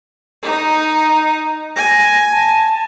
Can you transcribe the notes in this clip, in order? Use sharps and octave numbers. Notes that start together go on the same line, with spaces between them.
D#4
G#5 A#6
A5